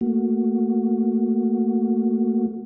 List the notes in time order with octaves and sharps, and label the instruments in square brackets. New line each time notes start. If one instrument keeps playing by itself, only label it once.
[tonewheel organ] A3 A#3 F#4